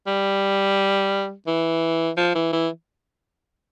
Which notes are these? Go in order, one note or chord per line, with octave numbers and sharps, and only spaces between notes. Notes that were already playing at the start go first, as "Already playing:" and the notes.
G3
E3
F3
E3
E3